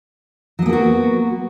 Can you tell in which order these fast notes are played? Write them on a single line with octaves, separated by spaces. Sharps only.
F#3 B3 A#3 G4 F#4